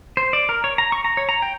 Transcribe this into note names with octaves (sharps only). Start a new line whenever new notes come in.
C5
D5
A#4
C#5
A#5
C#6
A#5
C#5
A#5
G5